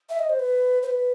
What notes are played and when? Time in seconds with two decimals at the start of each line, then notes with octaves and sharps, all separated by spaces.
0.10 E5
0.19 D#5
0.29 C5
0.40 B4
0.83 C5
0.86 B4